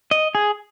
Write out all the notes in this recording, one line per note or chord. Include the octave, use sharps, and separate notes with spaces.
D#5
G#4